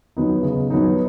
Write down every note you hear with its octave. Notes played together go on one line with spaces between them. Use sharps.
F#3 B3 D#4
C#3
F#3 B3 D#4